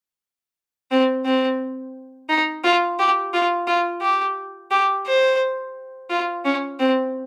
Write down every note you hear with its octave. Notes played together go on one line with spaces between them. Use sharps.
C4
C4
D#4
F4
G4
F4
F4
G4
G4
C5
F4
C#4
C4